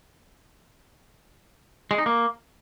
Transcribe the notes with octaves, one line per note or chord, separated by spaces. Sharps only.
G#3
D#4
A#3